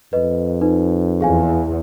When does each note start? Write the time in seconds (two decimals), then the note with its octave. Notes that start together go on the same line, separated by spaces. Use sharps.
0.13 F2 B4 D#5
0.61 D#4 B4
1.21 E2 G#4 F5 G#5